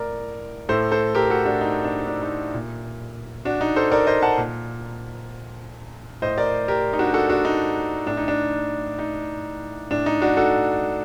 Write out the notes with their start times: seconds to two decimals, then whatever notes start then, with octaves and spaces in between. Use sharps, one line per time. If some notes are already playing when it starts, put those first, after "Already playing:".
Already playing: A2 A#4 D5
0.69 A2 A4 C5
0.92 A4 C5
1.15 G4 A#4
1.30 F#4 A4
1.46 D4 F#4
1.61 D#4
1.84 D4
2.07 D4
2.23 D#4
2.54 A#2
3.45 D4 F#4
3.61 D#4
3.76 A4 C5
3.92 A#4 D5
4.07 C5 D#5
4.22 F#5 A5
4.38 A#2
6.22 A2 C5 D#5
6.38 A#4 D5
6.68 G4 A#4
6.93 D#4
6.99 D4 F#4
7.14 F#4 A4
7.30 D4 F#4
7.45 D#4
8.06 A2 D4
8.17 D#4
8.28 D4
8.99 D#4
9.91 A2 D4
10.06 D#4
10.22 D4 F#4
10.37 F#4 A4